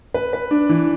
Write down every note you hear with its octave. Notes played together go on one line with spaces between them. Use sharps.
B4
B4
D4
E3